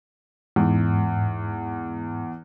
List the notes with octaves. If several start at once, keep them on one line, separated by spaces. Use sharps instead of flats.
E2 G#2